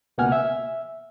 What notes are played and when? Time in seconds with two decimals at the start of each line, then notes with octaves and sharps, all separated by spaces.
0.18 C#2 B2 A#3 F#5 G#5 F6
0.32 E5